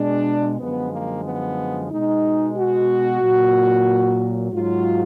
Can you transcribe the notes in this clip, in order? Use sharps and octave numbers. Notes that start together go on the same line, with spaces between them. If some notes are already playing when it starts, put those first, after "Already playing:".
Already playing: B2 G#3 D4
F#2 D3 F3 G#3 B3
A#3
B3
B2 G#3 D#4
F#4
A#2 F#3
G#2 F#3 F4